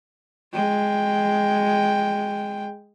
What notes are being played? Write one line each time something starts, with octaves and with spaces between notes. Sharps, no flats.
G#3 G5